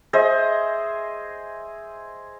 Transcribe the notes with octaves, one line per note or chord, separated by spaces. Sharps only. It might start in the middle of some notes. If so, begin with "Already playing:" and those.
G#4 C5 D#5 E5